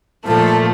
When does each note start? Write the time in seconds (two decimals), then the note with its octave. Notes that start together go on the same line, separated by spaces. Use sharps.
0.25 A#2 F3 A3 A4